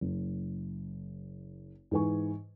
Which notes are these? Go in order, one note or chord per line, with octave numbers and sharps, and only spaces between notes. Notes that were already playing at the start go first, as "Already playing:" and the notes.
F#1
G#2 E3 B4 G#5 C#6